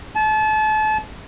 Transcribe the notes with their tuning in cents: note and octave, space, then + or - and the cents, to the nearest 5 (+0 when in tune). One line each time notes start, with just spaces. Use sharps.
A5 -35